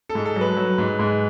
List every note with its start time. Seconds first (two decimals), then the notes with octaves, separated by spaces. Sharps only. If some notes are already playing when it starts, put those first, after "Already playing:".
0.09 A4
0.15 G#2
0.25 A4
0.36 F#3 B4
0.57 F#3
0.78 G#2
0.99 G#2